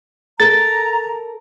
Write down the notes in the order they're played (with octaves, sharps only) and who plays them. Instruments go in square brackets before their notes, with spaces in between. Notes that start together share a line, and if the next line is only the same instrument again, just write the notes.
[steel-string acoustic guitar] A4 A#4 [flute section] A#5 [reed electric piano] A6